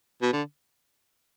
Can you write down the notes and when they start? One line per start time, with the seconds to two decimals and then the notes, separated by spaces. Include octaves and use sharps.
0.22 B2
0.33 D3